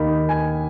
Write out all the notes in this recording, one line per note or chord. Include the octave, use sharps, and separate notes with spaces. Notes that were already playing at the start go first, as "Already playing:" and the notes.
Already playing: D#2 D#3 A#3 D#4 B5
G#5